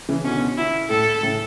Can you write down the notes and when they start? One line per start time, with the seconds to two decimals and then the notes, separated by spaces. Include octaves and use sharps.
0.09 C#3 E3
0.24 B2 D3 C#4
0.57 E4
0.89 A2 A4
1.23 A2 C#3